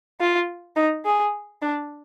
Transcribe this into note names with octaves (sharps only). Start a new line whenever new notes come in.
F4
D#4
G#4
D4